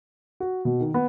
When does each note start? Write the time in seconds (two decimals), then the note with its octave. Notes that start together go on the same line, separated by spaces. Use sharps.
0.40 F#4
0.65 B2
0.80 D#3
0.94 B3